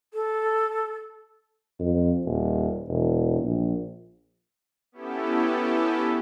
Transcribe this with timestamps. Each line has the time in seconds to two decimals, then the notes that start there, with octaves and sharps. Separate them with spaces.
0.14 A4
1.80 F2
2.25 D#1
2.88 E1
3.42 A#1
4.92 B3 C#4 E4 G4 A4